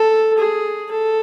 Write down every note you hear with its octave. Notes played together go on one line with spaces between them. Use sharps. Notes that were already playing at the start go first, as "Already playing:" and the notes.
Already playing: A4
G#4
A4